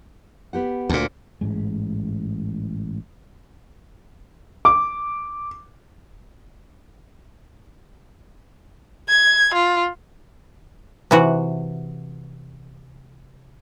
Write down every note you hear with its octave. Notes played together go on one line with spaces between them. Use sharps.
B3 G4 F#5
D2 A#2
A1 G#2 G#3
D6
G#6
F4
C3 E3 F#4